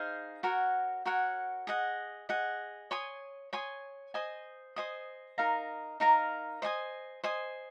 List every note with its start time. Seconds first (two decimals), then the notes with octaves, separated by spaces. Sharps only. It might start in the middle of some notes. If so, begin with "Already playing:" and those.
Already playing: D#4 G#4 C5 F5
0.43 F#4 A#4 C#5 F#5
1.05 F#4 A#4 C#5 F#5
1.67 G#4 D#5 F#5
2.29 G#4 D#5 F#5
2.91 C#5 G#5 C6 D#6
3.53 C#5 G#5 C6 D#6
4.14 C5 D#5 G#5 D#6
4.76 C5 D#5 G#5 D#6
5.38 D#4 A#4 F5 A#5
6.00 D#4 A#4 F5 A#5
6.62 C5 D#5 G#5 D#6
7.23 C5 D#5 G#5 D#6